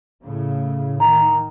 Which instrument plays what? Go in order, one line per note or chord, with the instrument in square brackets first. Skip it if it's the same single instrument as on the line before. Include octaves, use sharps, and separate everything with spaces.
[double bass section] A2 C#3
[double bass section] D#3 [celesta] A#5